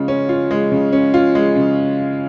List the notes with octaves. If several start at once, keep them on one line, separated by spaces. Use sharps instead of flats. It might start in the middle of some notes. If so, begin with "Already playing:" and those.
Already playing: C#3 G#3 F4
C#4
F4
G#3
C#3
C#4
F4
G#3
C#3